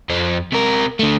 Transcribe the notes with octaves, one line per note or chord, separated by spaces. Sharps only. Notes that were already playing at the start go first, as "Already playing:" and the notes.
F2 C4
C3 A#4
D3 A3